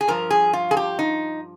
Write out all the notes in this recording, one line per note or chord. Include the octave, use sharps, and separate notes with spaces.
G#4
G2 F3 A#4
G#4
F4
G#4
G4
D#4